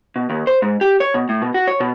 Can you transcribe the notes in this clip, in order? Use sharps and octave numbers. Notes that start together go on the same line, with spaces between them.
B2
D#2
C5
G#2
G4
C#5
B2
A2
B2
F#4
C#5
B2